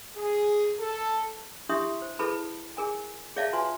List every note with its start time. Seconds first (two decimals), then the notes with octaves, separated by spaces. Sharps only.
0.16 G#4
0.78 A4
1.69 D4 E4 G4 E5 C6 D#6
2.02 C5
2.19 E4 G#4 A4 B4 A5 B5
2.77 G#4 A#4 G#5
3.36 G#4 C#5 D5 E5 F5 A5
3.53 F4 F#4 B4 G#5 C6